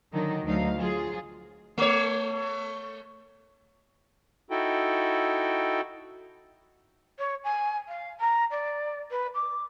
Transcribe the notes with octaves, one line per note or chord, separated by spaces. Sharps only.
D3 D#3 F#3 D#4
D2 F#3 D#4 F5
F#3 F4 G#4
A3 C#5
D#4 E4 F#4 A4 G5
C#5
G#5
F5
A#5
D5
B4
D6